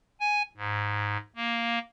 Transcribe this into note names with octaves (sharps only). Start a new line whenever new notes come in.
G#5
G#2
A#3